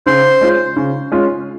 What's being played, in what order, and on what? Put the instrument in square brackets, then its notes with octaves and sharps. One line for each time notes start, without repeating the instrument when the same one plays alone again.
[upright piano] C#3 [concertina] C5
[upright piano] G#3 C#4 F4
C#3
G#3 C#4 F4